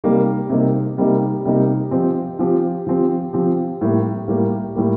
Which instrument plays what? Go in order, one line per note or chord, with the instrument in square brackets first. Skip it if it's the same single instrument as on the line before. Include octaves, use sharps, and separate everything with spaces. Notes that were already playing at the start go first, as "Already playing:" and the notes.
[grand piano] C3 G3 A#3 D#4
C3 G3 A#3 D#4
C3 G3 A#3 D#4
C3 G3 A#3 D#4
F3 C4 G4
F3 C4 G4
F3 C4 G4
F3 C4 G4
A2 G3 A#3
A2 G3 A#3
A2 G3 A#3